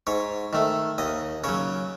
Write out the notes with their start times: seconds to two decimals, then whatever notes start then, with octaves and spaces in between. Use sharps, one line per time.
0.07 G#2 C#5
0.53 D#3 A3
0.98 D#2 D#5
1.44 C#3 F#3 C#5